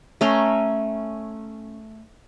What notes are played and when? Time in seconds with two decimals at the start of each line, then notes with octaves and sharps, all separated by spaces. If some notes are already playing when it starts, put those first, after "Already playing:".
0.21 A3 C#4 A#5 C6